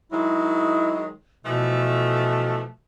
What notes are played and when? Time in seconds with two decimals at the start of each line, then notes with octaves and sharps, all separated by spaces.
0.12 D#3 F#3 G#3 E4
1.45 B2 E3 F3 A3